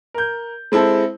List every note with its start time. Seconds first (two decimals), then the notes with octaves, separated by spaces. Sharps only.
0.14 A#4 G6
0.72 G#3 C4 E4 A4